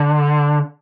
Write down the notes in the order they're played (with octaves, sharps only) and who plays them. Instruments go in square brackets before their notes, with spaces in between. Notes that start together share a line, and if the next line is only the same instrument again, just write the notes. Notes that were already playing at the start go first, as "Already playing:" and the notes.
Already playing: [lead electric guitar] D3